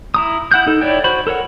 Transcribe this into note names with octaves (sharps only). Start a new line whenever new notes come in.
E4 A#5 D#6
E4 F#5 F#6 G6
D#4 A4
E4 C#5 D5 G5
F#4 C5 B5
A4 A#4 C#5 F#5